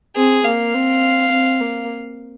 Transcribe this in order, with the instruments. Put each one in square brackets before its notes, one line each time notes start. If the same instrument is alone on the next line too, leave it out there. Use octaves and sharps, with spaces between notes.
[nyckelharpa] C4 [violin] G#4
[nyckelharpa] A#3 [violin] F5
[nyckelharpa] C4
C4
A#3